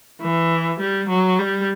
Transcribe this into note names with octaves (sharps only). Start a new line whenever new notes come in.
E3
G3
F#3
G3